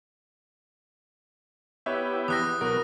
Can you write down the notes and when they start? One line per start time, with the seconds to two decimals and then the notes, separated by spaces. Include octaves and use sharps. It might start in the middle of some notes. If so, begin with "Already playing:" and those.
1.86 B3 E4 G4 B4 C#5 E5
2.28 E2 D#6 F#6 A#6
2.61 B2 F#3 A#4 B4